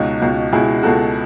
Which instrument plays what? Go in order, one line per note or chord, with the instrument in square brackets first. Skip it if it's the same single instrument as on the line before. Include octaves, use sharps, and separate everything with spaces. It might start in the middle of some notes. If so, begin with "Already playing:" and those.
Already playing: [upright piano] C#2 B2 D#4 F#4
C#2 B2
C#2 B2 E4 G#4
C#2 B2 F#4 A4